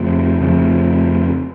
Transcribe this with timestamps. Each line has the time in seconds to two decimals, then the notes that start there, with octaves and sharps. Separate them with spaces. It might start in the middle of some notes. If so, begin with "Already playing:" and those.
Already playing: F2 C#3 F3 A3
0.41 F2 C#3 F3 A3